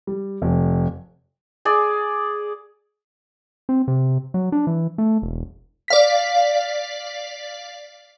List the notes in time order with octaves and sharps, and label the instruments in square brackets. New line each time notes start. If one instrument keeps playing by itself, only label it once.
[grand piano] G3
F1
[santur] G#4 D5
[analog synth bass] C4
C3
F#3
D4
E3
A3
E1
[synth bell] D5 F5 B6